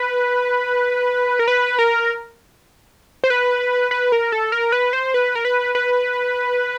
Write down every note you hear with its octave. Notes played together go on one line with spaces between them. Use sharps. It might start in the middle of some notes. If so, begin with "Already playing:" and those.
Already playing: B4
A#4
B4
A#4
C5
B4
B4
A#4
A4
A#4
B4
C5
B4
A#4
B4
B4